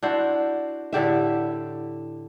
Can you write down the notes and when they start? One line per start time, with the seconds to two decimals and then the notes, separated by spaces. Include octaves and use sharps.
0.03 D4 E4 F#4 C5
0.93 A2 D3 G4 E5